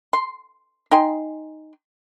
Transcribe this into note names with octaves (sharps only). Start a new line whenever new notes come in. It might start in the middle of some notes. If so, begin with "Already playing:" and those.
C6
D#4 G5 G#5 C6